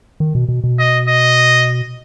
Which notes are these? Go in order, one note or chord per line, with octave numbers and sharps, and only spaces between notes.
D#3
B2
B2
B2
D#5
D#5